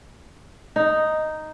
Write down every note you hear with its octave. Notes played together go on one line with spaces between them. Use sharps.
D#4